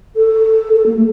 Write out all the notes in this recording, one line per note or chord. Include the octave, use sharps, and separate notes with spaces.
A4
A4
A#3
A3